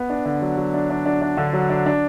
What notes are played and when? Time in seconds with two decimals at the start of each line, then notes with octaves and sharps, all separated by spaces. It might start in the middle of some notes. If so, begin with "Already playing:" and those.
Already playing: B3
0.10 D4
0.25 D3
0.42 F#3
0.57 F#3
0.74 D4
0.90 D4
1.06 D4
1.22 D4
1.37 D3
1.53 F#3
1.69 D4
1.86 D4